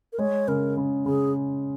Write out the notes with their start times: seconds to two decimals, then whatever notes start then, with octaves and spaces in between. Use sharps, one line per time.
0.13 A#4
0.18 G#3 C#5
0.48 C#3 A#4
0.77 C#3
1.06 C#3 G#4